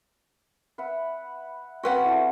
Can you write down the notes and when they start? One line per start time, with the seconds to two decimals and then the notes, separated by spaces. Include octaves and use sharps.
0.78 B4 E5 F#5
1.83 C4 C#4 F#4 B4 F#5
2.05 E4 A4 A5